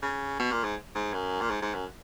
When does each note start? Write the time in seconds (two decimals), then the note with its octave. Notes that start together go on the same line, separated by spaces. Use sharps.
0.02 C#3
0.39 B2
0.52 A#2
0.64 G#2
0.95 G#2
1.13 F#2
1.41 A#2
1.50 G#2
1.62 G#2
1.74 F#2